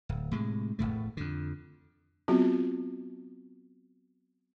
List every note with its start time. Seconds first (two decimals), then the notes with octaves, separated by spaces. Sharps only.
0.09 D1
0.31 A2 C3 G#3
0.79 E1 B1 A2 A3
1.17 F2 D3
2.28 F#3 B3 C4 F4 F#4 G#4